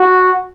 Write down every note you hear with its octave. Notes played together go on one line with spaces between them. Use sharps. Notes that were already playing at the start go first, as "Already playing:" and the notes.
Already playing: F#4